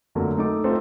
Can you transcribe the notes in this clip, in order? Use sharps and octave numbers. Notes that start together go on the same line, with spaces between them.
F2 D3 F#3 A3 A#3
A3 D#4 A4 D6
A3 C4 D#4 F4 A4 C5